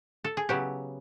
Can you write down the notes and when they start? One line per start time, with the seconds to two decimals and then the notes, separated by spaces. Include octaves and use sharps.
0.24 A4
0.37 G#4
0.49 C#3 F#3 B3 E4 G4